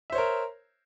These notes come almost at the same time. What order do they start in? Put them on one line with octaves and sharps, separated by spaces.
E5 C5 C#5 A#4